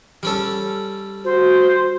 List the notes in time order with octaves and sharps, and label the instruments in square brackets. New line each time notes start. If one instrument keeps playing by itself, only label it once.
[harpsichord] G3 C#4 A4
[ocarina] F#4 [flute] C5